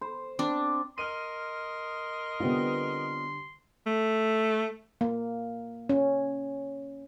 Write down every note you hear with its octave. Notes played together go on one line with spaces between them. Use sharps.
C5
C4 D4
A#4 D#5 C6 F6 D#7
D3 G3 B3 C4 F4
A3
A#3
C#4